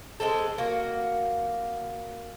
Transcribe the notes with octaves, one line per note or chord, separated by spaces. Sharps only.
G#3 C4 G4 A4
A#3 F#4